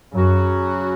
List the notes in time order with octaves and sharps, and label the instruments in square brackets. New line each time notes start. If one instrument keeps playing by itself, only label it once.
[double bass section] F#2 [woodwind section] C#3 F#3 C#4 F#4